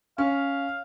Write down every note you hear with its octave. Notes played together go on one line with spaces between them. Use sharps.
C#4 F5